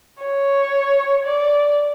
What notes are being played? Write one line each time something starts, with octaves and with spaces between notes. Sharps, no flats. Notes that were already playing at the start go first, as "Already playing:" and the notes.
C#5
D5